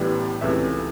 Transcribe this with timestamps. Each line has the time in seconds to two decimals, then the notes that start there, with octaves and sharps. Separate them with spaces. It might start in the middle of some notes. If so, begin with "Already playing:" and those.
Already playing: A1 A2 E3 G3 B3
0.41 C#2 C3 E3 A3 E5